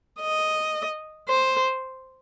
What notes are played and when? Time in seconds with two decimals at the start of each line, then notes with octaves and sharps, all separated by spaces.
0.21 D#5
1.28 C5